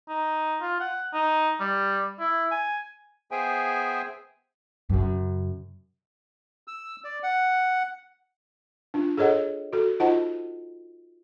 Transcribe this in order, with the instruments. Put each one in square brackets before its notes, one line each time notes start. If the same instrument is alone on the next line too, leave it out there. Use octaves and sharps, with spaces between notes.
[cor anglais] D#4
F4
F#5
D#4
G3
E4
G#5
[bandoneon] B3 G#4 C5 E5 G5 G#5
[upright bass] F#2 C#3
[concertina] E6
D5
F#5
[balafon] D4 F4
G#4 A4 C#5 D#5 F#5
F#4 A4
D#4 F4 C5 D#5 F#5 A5